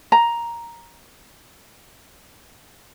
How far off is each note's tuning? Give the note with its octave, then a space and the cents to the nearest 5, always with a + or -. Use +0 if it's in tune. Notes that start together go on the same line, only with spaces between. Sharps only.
A#5 +5